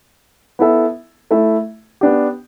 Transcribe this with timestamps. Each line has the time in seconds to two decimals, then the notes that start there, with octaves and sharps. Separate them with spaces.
0.59 B3 E4 A4 E5
1.31 A3 E4 A4 E5
2.01 B3 D4 G4